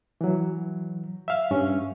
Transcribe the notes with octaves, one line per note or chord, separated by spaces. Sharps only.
E3 F#3
E5 F5
G2 C#4